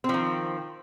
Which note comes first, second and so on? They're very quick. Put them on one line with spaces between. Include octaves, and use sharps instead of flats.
C4 F3 D#3